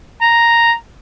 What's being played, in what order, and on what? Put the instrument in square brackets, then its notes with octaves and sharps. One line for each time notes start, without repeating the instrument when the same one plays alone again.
[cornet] A#5